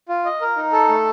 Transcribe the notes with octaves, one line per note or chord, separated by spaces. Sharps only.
F4
D#5
A#4
D#4
A4
A3